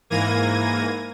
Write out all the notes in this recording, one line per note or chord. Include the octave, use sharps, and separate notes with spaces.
G#2 E3 A#3 G#6 A#6 D#7